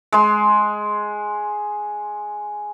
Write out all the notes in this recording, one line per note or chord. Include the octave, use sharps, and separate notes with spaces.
G#3 C6